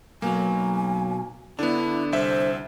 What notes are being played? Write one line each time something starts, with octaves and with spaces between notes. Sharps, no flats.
B1 F#3 A#3 G#5
D3 B3 D4 E4
C2 C5 E5